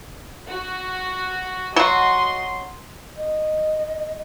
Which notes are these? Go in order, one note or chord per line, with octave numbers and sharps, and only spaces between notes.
F#4
F#3 F#4 D#5 C6
D#5